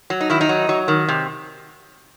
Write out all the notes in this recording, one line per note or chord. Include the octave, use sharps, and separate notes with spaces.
F#3
D#4
D#3 E4
D#4
F#3
F#3
D#3
C3